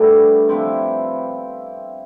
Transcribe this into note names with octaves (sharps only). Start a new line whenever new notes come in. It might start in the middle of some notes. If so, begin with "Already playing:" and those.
Already playing: D3 G3 A3 B3
C3 F3 B3 C4 E4